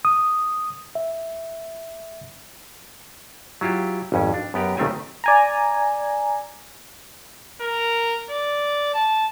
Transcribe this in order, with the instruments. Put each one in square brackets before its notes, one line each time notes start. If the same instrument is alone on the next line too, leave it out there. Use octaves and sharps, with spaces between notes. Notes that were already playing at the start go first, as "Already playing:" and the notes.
[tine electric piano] D#6
E5
[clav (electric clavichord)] F#3 E4 F4 G4
G#1 F2 C#4
D4
F#2 B3 G4 A#4
B1 D#3 A3 C4 G4 G#5
[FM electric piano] D5 G#5 A#5
[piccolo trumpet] A#4
D5
A5